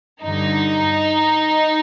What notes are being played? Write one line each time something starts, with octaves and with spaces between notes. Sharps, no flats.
G2 D3 D#4